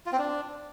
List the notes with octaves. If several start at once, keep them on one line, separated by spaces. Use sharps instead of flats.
F4
C4
D4